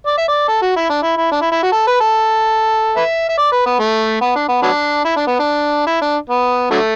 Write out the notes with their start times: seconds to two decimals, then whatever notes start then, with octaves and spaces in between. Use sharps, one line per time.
0.06 D5
0.17 E5
0.28 D5
0.48 A4
0.62 F#4
0.76 E4
0.90 D4
1.03 E4
1.17 E4
1.32 D4
1.41 E4
1.52 E4
1.63 F#4
1.72 A4
1.87 B4
2.00 A4
2.96 B4 E5
3.29 E5
3.38 D5
3.52 B4
3.66 B3
3.79 A3
4.21 B3
4.36 D4
4.48 B3
4.62 F#3 B3 D4
5.05 E4
5.16 D4
5.27 B3
5.39 D4
5.87 E4
6.02 D4
6.29 B3
6.70 D3 F#3 A3